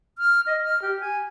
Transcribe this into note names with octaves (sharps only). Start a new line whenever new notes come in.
F6
D#5
F6
G4
G#5